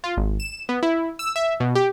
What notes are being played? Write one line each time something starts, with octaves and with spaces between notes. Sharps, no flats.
F4
G#1
E7
B3
E4
E6
E5
B2
G4